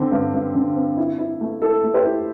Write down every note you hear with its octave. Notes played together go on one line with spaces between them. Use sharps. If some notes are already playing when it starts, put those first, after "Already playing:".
Already playing: D3 C4
G2
G2
D3
C4
E4
E4
A3
E4 A4
A3
G4 C5
E4